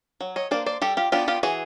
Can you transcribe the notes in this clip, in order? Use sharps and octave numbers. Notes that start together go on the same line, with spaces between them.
F#3
C#5 D#5
A#3 D4 C5 D5
C5 D5
G3 G4 A4
F4 G4
B3 D4 F4 G4
F4 G4
E3 F#4 G#4